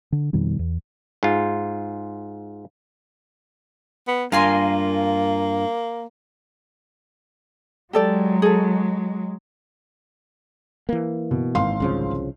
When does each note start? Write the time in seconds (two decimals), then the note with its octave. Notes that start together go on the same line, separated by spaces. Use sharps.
0.12 D3
0.33 F2 B2 D#3 G3
0.59 E2
1.23 G#2 F4
4.07 B3
4.32 G2 A#3 F4 A#4 G#5 C6
7.93 F#3 G#3 G4 A4 D5
8.42 G#4 A4
10.89 E3 A#3
11.31 B2
11.55 G#1 F5 C6
11.80 C2 C#3 F3